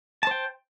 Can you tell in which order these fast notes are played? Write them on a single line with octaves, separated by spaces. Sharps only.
A5 C5 G5